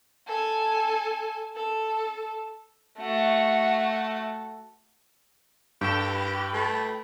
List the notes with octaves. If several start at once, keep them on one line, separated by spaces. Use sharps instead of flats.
A4 G#5
A4
A3 F#4
G2 G4 A4 G5 E7
B4 G5
A3